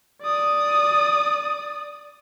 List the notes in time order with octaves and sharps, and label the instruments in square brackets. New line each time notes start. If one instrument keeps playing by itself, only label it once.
[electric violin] D5 D#6